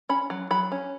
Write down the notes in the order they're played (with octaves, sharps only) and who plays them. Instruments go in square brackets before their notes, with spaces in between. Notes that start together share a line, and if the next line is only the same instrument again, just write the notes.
[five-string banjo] C#4 B5
F#3
F#3 B5
C#4